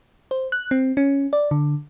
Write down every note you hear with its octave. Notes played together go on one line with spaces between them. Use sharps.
C5
F#6
C4
C#4
D5
D3